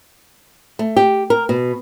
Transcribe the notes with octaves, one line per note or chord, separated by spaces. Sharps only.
A3
G4
A#4
B2